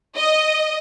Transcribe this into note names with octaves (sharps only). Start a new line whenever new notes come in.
D#5